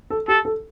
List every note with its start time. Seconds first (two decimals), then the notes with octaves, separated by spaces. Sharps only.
0.10 A4
0.28 G4 A4
0.45 A4